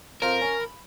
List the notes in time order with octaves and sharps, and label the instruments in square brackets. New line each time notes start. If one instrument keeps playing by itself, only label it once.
[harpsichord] F2 F4 C5 [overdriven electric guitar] A#4
[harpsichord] C#4
B5